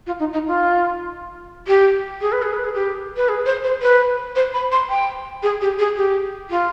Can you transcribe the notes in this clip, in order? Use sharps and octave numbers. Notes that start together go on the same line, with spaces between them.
F4
D#4
D#4
F4
G4
G#4
B4
G#4
B4
G#4
G4
B4
G#4
C5
C5
B4
C5
B5
C6
G5
G#4
G4
G#4
G4
F4